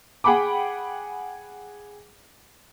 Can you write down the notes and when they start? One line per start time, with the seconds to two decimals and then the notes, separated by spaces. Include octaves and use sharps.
0.24 G#4 F#5 G5 B5 D6